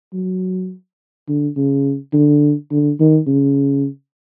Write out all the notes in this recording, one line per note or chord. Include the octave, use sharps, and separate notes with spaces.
F#3
D3
C#3
D3
D3
D#3
C#3